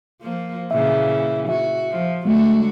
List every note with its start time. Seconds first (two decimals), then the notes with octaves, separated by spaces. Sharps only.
0.22 F3 A#3
0.71 A#2 C#3 E3 E5
1.49 F#4 E5
1.91 F3
2.25 D3 F#3 G#3 A3 F#4